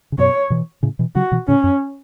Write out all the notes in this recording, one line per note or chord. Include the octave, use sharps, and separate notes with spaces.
C#3
F#2 B2 C#5
B2 E3
A2 C#3
B2 E3
C#3 F#3 F#4
B2 E3
A2 C#3 C#4
F#2